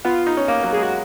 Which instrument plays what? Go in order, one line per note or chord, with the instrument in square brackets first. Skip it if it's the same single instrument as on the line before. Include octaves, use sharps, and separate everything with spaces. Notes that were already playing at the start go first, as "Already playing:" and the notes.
[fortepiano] B3 [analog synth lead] F4
[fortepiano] D#4
C#4
A#3
F#3
[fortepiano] G#3 [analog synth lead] G#4
[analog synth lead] F#4